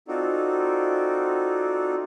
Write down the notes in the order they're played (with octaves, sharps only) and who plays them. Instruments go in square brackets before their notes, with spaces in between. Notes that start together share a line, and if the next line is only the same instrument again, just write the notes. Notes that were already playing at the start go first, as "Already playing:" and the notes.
[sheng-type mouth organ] C4 D#4 F4 F#4 A4 D5